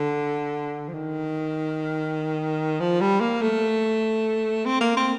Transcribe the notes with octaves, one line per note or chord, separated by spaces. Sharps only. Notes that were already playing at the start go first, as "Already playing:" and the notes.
Already playing: D3
F3
D#3
F3
G3
A#3
A3
C4
A#3
C4